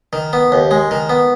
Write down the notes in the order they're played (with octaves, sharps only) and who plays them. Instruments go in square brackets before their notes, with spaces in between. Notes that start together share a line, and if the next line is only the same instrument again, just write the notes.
[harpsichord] D#3
B3
D#2
G#3
D#3
B3